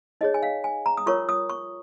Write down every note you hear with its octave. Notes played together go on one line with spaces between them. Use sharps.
D#4 G#4 C#5 D#5
G#5
F5
G#5
A#5
D#6
F4 A#4 C#5 C#6
D#6
C#6